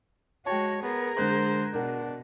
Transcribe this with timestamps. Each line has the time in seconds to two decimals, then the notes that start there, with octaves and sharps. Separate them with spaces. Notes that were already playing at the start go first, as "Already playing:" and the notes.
0.46 G#3 F#4 C#5 G5 A5
0.83 B3 G#4 A#4
1.17 D3 G#3 C5 F#6
1.74 B2 D4 A#4 F#5